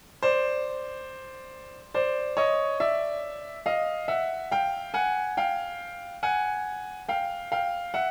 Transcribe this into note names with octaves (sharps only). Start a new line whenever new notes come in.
C5 D5
C5 D5
C#5 D#5
D5 E5
D#5 F5
E5 F#5
F5 G5
F#5 G#5
F5 G5
F#5 G#5
F5 G5
F5 G5
E5 F#5